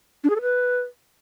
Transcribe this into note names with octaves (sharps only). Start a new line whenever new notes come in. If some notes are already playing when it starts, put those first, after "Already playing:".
D4
G#4
A4
B4